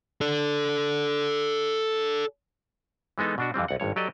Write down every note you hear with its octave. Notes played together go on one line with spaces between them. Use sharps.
A4 D5
E3 G#3 B3 D#4 A4
B2 D4 F#4
F2 E3 G3 C4
C2 F#5
G#1 G2 C#5
F#3 G4 A4 D5 D#5